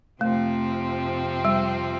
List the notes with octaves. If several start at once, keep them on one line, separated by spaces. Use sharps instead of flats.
F2 C3 F3 A3 C4
G3